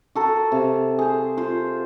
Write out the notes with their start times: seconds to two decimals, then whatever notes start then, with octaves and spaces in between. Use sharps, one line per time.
0.15 F#4 A4 A#4
0.52 C3 F5
0.99 G#4 C5
1.37 F4 C5